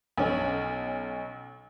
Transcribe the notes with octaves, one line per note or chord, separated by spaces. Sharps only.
B1 C#4